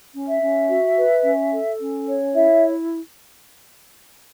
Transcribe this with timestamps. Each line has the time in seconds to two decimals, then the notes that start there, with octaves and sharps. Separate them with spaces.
0.14 C#4
0.27 E5
0.42 C#4
0.69 F#4
0.96 B4
1.23 C#4
1.52 A4
1.79 C#4
2.07 C#5
2.33 E4 E5